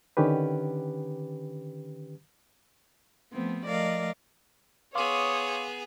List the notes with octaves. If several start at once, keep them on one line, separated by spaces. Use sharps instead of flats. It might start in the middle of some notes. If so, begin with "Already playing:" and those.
D3 D#3 C#4 G4 B4
F3 A3 B3 C4
F3 A3 A#4 D5 D#5 F5
B3 G#4 C#5 F5 C6 D6 D#6